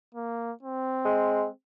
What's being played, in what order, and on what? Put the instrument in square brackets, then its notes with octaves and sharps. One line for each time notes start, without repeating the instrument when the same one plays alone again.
[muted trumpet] A#3
C4
[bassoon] G#3